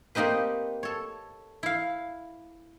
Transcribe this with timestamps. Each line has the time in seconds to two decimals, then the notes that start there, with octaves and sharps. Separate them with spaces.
0.15 A#3 C4 D#4 G4 B4
0.83 A4 C#5
1.63 E4 F5